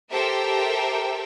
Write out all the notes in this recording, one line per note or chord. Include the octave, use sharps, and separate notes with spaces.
G4 A4 A#4 C5 E5 G5